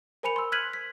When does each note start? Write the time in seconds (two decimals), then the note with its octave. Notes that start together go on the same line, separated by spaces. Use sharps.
0.23 A#4 C5 G#5 B5 C#7 F7
0.36 C6 E6
0.52 F6 F#6 G#6 B6 D#7 F#7
0.73 B6